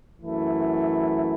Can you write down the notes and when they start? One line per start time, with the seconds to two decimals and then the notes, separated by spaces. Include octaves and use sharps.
0.21 F#2 E3 A3 E4